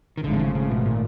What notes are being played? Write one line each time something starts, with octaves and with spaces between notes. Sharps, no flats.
D#3
G#1 G#2 D3 F3 A3
C3
C#3
C#3
B2
A#2